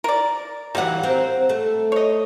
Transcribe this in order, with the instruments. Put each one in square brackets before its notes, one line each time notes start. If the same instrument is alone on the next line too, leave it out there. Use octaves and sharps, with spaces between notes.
[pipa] A#4 D5
[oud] E3 F#3 A#3 [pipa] G3 F#5
[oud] C4 A#4
A3
[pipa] C#5 D#5